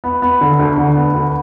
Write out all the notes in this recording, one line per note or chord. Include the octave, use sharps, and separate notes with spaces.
B3
B3
D3
D2
D3
B3
D2